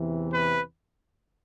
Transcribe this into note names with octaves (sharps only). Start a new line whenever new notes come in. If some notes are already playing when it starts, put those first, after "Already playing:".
Already playing: E2 C3 E3
B4